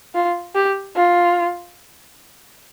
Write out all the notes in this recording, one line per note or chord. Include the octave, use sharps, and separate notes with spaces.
F4
G4
F4